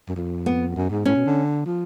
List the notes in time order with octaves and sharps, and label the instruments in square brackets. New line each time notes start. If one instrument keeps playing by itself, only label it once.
[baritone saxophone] F#2
F2
[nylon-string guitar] B3
[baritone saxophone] F#2
G#2
[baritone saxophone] A2 [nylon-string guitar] C#4
[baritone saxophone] B2
D3
F3